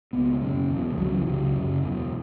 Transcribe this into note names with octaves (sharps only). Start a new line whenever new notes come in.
C#2 B2 B3
F#2 C#3
E2 B2
A3
C#2 C#3 F#3
E3
C#2 C#3 F#3
F#2 C#3
E2 B2